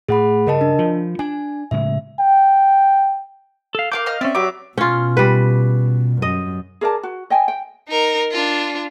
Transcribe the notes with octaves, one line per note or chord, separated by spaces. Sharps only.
A2 G#4 F#5 B5
G2 C#3 A#4 D#5 A5
D4
F3 F4
D4 G#5
A2 C#3 G#3 E5
G5
A4 F5
A#4 F5 G5 D6 G6
D#5 F5 F6
C4 C#4 D5 E5
F#3 G4 B4 D6
B2 C#4 F4
G3 B4
F#2 D#5
G#4 A#4 D5 A5
F#4
D#5 G5 G#5
G5
D#4 A#4
D4 F4